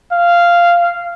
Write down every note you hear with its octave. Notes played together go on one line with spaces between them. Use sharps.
F5